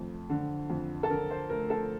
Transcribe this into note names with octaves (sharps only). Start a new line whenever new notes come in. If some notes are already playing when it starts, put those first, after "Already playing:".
Already playing: F2 A3
D3
F2
A4
D3 A#4
C5
A3 A#4
A4